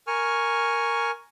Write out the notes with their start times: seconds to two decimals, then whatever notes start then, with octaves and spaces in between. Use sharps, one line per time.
0.07 A#4 G#5 C#6 F6